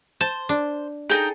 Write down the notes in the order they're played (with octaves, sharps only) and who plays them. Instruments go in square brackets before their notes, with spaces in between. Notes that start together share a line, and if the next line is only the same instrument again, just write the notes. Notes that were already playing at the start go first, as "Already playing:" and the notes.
[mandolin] C5 [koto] A5
[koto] D4
[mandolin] D#4 G5 A#5 [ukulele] G#4 A4